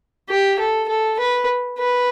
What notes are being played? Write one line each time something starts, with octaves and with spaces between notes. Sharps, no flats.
G4
A4
A4
B4
B4